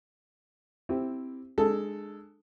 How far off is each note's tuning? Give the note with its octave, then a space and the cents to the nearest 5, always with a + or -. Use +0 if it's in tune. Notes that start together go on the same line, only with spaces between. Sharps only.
C4 +0 E4 +0 G4 +0
G#3 +0 D4 +35 A4 +0